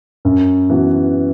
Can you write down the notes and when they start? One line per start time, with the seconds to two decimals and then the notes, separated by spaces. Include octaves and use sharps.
0.25 F#2
0.70 E3 B3 F#4